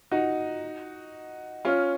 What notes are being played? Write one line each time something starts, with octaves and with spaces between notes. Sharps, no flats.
D#4 F#4
C#4 F4